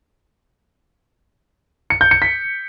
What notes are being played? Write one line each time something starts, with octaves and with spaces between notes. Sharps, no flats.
C#7
G6
C#7
B6